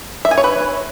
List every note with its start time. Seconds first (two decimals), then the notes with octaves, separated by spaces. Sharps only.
0.25 E5
0.31 G#5
0.37 C#5
0.44 B4